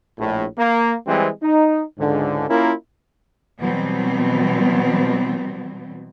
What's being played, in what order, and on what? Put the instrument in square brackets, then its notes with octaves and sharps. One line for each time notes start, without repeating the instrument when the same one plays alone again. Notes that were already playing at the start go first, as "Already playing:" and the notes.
[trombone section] A#1 A2
A#3
E3 G3 G#3 C4
D#4
C#2 G#2 D3
A#3 C#4 E4 F4 A#4
[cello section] B2 E3 F#3 G3 B3 C4